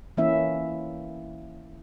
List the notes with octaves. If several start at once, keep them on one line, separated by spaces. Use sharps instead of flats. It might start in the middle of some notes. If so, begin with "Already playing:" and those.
E3 A#3 C#4 E4 E5